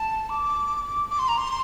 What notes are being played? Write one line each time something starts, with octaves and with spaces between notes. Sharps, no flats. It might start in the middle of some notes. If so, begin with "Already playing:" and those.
Already playing: A5
D6
D6
C6
A#5
C6